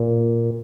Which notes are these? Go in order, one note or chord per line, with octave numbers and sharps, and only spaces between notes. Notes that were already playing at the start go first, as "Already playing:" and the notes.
Already playing: A#2